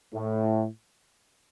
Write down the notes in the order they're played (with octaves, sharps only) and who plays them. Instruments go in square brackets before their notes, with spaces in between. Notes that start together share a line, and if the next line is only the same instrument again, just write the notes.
[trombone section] A2